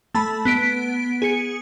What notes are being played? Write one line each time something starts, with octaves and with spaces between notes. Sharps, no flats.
A3 A5 B5
B3 B6 D7
G#4 C#7